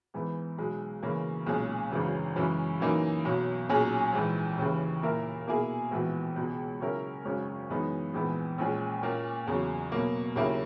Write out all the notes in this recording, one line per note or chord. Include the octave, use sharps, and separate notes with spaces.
G#2 E3 B3
B1 B2 G#3
C#3 E3 A#3 C#4
B1 A#2 G#3 C#4 G#4
G#1 F#2 C#3 E3
F#2 C#3 E3 G#3 C#4
F#2 E3 A#3 D#4
B1 B2 F#3
B1 A#2 F#3 C#4 G#4
A#1 G#2 E3
D#2 C#3 E3
A#2 A#3 E4 A#4
B2 A#3 E4 G#4
A#1 G#2 E3 B3 F#4
C#2 B2 G#3
C#3 F#3 C#4 E4 A#4
G#1 F#2 C#3 G#3 C#4
F#2 E3 G#3 B3 D#4
A#1 G#2 E3 B3
A#1 A#2 G#3 C#4 G#4
A#2 A#3 C#4
E2 C#3 F#3
B2 F#3 A#3
D#2 C#3 F#3 A#3 E4